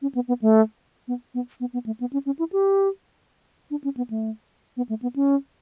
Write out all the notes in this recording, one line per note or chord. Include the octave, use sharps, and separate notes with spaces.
C#4
B3
B3
A3
B3
B3
B3
B3
A3
B3
C#4
C#4
E4
G4
D4
C#4
B3
A3
B3
A3
B3
C#4